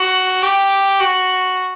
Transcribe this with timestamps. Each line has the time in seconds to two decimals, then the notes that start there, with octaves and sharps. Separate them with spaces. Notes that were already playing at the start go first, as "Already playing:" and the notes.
Already playing: F#4
0.43 G4
1.00 F#4